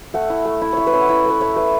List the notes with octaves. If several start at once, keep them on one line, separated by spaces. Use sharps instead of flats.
A3 F#5
E4
A3
E4
E4 C#5 E5
B4
C#4 C#5
F#5
E4 E5
A3 B4
A3 C#5
A3 B4